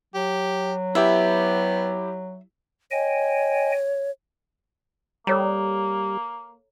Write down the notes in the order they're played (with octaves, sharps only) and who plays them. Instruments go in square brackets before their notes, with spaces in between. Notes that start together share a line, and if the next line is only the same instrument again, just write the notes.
[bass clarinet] F#3 [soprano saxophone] G4
[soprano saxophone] B3 [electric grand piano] E4 G4 [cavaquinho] E5
[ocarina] C#5 [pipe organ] D#5 G5 G#5
[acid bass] G3 [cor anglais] A#3 [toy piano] A4 C#5 A#5